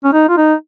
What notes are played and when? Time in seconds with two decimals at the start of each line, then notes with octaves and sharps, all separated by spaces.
0.04 C#4
0.13 D#4
0.29 F4
0.37 D#4